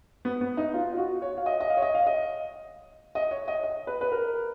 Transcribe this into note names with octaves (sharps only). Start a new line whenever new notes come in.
B3
B3
D#4
F4
F4
F#4
C#5
F5
D#5
D#5
F5
C#5
D#5
F5
D#5
D#5
C#5
D#5
D#5
B4
B4
A#4